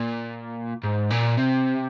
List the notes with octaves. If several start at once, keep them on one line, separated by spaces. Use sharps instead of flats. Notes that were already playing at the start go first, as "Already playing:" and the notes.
Already playing: A#2
G#2
A#2
C3